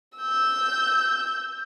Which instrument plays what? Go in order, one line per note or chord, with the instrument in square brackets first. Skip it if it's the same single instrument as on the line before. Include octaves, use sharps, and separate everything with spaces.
[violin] E6 G6